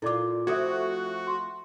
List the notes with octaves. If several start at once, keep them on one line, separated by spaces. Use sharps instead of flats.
A#2 E4 F4 A4 D5 D6
F3 A3 C4 F4 F#4 E5 D#6 G#6
C6